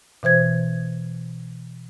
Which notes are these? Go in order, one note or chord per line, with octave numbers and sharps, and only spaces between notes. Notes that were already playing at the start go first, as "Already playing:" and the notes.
B2 E3 C5 G#6